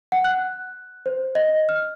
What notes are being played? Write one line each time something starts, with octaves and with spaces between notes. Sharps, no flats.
F#5
F#6
C5
D#5
F6